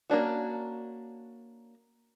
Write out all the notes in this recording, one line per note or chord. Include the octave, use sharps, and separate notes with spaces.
A#3 C#4 D4 F#4